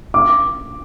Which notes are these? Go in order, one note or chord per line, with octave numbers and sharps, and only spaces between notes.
D6